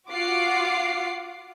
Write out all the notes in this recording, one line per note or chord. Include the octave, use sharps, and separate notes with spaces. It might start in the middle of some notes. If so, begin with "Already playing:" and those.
F4 F#4 F#5 D6 C7